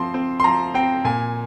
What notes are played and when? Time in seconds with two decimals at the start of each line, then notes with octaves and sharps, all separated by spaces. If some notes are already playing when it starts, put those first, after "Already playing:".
Already playing: F3 C4 C6
0.14 C4
0.40 C6
0.44 F3 A#5
0.74 C4 G5
1.04 A#2 G#5